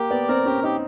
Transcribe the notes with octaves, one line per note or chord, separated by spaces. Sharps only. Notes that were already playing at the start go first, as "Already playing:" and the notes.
Already playing: A#3 G4
B3 D5
C4 A#4
C#4 G4
D#4 G4